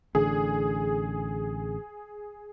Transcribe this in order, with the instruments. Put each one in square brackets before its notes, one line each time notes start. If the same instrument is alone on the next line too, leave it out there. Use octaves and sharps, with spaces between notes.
[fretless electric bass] A1 D3 [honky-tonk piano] G#4